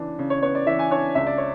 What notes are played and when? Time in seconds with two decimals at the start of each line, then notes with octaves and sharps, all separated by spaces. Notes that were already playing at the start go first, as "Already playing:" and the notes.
Already playing: C#3 E3 D4
0.19 C#3
0.30 C#5
0.42 B3 C#5
0.55 D5
0.66 E3 E5
0.79 G#5
0.91 D4 C#5
1.15 C#2 E5
1.26 D5
1.38 C#5